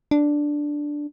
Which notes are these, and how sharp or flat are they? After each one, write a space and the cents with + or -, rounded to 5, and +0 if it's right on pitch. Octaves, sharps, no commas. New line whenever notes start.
D4 +0